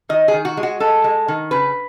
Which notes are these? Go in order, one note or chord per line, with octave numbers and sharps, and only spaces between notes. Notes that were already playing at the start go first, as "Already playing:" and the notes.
D#3 D#5
G#4
D#3
F#4
G#3
F#4
G#3 A4
G#3
D#3
C#3 B4